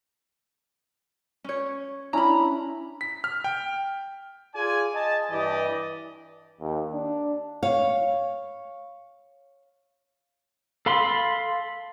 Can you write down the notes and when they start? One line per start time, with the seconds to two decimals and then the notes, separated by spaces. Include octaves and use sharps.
1.44 C#4 C#5
2.13 C#4 D4 E4 A#5 B5
3.01 B6
3.24 F6
3.44 G5
4.54 F4 G#4 D5 G#5
4.94 D#5 G#5 A5
5.31 G2 E3 G4 D5 D#5
6.61 D#2
6.93 D4
7.63 C#5 F5
10.86 A4 F5 B5 C6